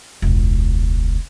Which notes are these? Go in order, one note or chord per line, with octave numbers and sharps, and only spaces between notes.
E1 C#2